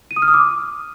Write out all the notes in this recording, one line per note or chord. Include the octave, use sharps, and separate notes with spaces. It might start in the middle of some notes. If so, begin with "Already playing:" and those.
D#7
D#6
F6
D#6
D6